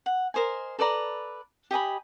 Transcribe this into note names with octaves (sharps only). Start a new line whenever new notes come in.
F#5
A#4 C5 D#5 G#5
A4 B4 D5 A#5
G4 D#5 G#5 B5